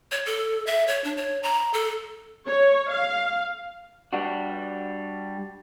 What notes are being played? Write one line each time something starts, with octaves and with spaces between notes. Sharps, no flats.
C#5
A4
E5
C#5
D4
C#5
A#5
A4
C#5
F5
G3 D4 F#4